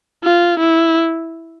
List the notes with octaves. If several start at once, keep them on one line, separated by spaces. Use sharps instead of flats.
F4
E4